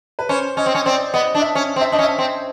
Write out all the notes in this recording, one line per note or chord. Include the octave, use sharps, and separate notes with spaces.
B4
C#4 C5
C#4 D#5
C4
C#4
C4 D5
B3 D#5
D4
E5
C#4
C4
E5
D4 D#5
C#4
E5
C4